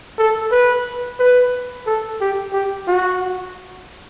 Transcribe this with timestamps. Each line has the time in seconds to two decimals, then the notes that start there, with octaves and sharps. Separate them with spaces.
0.18 A4
0.51 B4
1.19 B4
1.87 A4
2.21 G4
2.53 G4
2.88 F#4